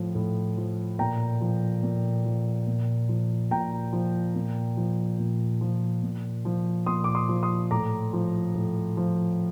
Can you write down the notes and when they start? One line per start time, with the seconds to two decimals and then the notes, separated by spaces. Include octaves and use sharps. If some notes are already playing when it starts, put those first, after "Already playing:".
Already playing: A2 F3
0.15 A2
0.57 F3
0.99 A#2 G5 A#5
1.41 F3
1.83 A#2
2.25 F3
2.67 A#2
3.09 F3
3.51 A#2 G5 A#5
3.93 F3
4.35 A#2
4.77 F3
5.19 A#2
5.61 F3
6.03 A#2
6.45 F3
6.86 A#2 C6 D#6
7.04 D6
7.15 C6 D#6
7.29 F3
7.43 C6 D#6
7.71 A2 A#5 D6
8.13 F3
8.54 A2
8.97 F3